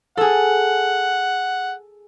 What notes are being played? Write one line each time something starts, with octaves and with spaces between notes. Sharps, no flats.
G#4 A4 F#5